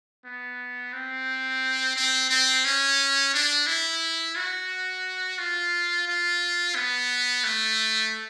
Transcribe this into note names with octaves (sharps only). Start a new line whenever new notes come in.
B3
C4
C4
C4
C#4
D4
E4
F#4
F4
F4
B3
A3